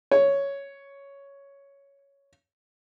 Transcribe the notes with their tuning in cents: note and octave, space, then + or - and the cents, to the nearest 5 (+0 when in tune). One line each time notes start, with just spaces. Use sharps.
C#5 +5